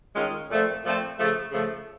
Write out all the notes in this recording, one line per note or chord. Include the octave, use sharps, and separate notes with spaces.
D#3 G#3 C#4 F4
A#2 F3 A3 C4
A#2 F3 A3 C4
C#3 F3 A3
C#3 F3 A3